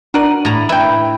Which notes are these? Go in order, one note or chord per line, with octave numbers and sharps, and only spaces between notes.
D4 F#4 A#4 D5 D#7 F#7
A2 A#5
E4 B4 G5